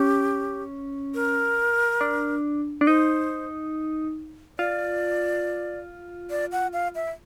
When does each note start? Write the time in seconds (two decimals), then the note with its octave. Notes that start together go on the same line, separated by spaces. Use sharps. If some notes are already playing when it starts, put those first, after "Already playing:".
Already playing: C#4 G4
1.14 A#4
2.01 D4
2.81 D4
2.87 D#4 C5
4.59 F4 D5
6.30 D5
6.52 F#5
6.73 F5
6.95 E5